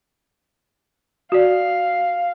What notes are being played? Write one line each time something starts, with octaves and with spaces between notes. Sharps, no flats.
F#4 D5 F5